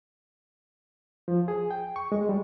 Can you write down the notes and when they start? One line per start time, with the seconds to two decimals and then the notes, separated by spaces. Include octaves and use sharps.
1.28 F3
1.48 G#4
1.71 G5
1.96 C#6
2.12 G#3
2.29 G3